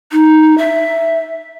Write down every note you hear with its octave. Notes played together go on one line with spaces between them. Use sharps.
D#4
E5